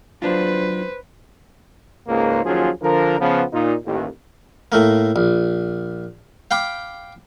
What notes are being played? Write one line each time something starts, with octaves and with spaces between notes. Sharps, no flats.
F#3 D4 F4 B4 C5
C#2 G#2 A#3
D#2 F3 F#3 C#4 F4 G#4
D3 F3 A#4
C#3 F3 B3
A#2 D#4 F4
A1 D#2
A2 A3 A#3
A#1
F5 G5 B5 D6